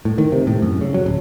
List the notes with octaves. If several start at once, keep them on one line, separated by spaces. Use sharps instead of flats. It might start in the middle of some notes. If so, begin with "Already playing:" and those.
A2
D#3
C3
A2
F#2
C#3
F#3
D1